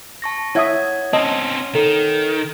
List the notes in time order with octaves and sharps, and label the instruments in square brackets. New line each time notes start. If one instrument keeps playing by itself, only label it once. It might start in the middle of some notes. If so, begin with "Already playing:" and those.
[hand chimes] A5 C#6 A#6
[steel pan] E4 E5 D#6 [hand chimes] C#5 F#5 G#6
[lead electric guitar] C4 C#4 [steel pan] D#5 [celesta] A5
[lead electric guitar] D#3 [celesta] A4